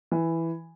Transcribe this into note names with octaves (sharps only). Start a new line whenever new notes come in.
E3